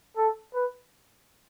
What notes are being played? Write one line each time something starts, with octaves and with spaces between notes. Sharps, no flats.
A4
B4